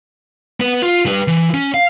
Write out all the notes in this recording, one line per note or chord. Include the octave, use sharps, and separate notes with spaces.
B3 B4
F4
G3 B4
E3
C#4
F5